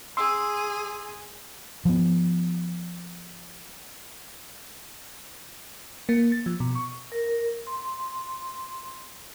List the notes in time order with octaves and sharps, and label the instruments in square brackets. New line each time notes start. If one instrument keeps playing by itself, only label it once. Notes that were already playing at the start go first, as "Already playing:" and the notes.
[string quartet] G#4 [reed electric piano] C6 E6
[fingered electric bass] F3 B3
[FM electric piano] A#3
A6
F3
B2
C#6
[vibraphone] A#4
C6